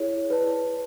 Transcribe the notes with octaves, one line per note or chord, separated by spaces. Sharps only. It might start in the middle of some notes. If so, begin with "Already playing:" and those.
Already playing: E4 G#4 C#5
E4 B4 D5 A5